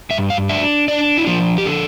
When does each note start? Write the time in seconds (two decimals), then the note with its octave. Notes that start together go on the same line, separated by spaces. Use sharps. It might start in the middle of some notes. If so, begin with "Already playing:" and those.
0.10 G2 E5
0.30 F5
0.49 D4 E5
0.88 D4 D5
1.18 E4
1.26 F3 F4
1.58 G4
1.66 D3 A4